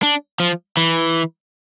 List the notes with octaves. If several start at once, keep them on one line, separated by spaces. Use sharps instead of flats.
D4
F3
E3